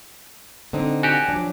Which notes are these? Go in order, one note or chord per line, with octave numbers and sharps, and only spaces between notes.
D3 C4 D#4
F#4 G4 G#5
F3 F#3 D4